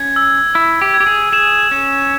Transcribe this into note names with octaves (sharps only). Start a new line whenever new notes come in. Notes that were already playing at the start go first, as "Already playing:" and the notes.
Already playing: C#4 G#6
E6
E4 E6
G4
G#6
G4
G#4
G#4 E7
C#4 E7